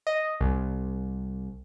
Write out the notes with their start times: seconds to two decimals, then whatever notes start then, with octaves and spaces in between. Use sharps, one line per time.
0.07 D#5
0.40 C2